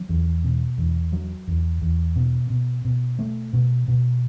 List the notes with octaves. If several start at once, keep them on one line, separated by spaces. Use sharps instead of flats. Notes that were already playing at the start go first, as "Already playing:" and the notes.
Already playing: F#3
E2
B2
E2
F#3
E2
E2
B2
B2
B2
A3
B2
B2